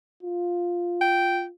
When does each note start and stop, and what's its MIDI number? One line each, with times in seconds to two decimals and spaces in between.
0.23 1.51 65
1.01 1.42 79